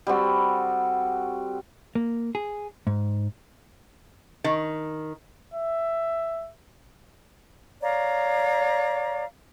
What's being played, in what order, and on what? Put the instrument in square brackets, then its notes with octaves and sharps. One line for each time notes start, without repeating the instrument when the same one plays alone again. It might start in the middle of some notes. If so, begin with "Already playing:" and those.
[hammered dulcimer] G3 C4 F#4 A4
[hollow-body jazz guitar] A#3
G#4
G#2
[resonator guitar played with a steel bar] D#3
[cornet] E5
[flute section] C#5 D5 F5 A#5